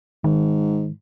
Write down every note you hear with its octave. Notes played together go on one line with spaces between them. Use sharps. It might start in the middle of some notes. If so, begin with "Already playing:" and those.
G#2 D#3